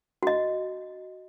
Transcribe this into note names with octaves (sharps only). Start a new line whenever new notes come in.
F#4 D#5